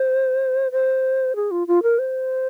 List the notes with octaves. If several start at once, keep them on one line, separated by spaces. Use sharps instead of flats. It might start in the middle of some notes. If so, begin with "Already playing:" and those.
Already playing: C5
C5
G#4
F4
F4
A#4
C5